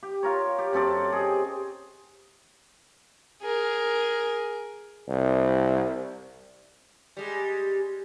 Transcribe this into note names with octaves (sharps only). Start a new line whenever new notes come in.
G4
F4 A#4 C#5
G4
F#2 C4 A4 D5
G4 G#4 D#5
G#4 A#4
C2
G3 G#3